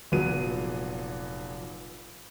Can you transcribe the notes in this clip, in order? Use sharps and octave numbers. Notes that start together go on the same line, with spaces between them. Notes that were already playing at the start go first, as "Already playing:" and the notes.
F1 A#2 F#3 B3 G#4 D#7